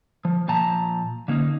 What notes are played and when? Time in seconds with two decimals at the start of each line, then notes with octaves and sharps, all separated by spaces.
0.25 F3
0.48 A#2 F3 A5 A#5
1.28 D3 A#3 C#4 D#4